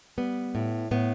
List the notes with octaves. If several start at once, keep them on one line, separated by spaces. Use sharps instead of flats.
G3 B3
A2
A2 B3